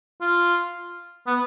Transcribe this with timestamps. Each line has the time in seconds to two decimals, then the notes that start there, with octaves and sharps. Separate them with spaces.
0.21 F4
1.27 B3